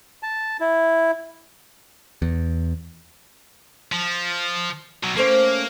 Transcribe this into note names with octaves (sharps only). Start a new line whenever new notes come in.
A5
E4
E2
F3
B2 F#3
A3 A#3 C#4 C5